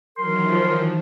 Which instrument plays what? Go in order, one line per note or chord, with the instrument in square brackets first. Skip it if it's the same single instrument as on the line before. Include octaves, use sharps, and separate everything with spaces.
[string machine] D#3 E3 F#3 [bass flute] A#4 [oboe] C6
[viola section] F3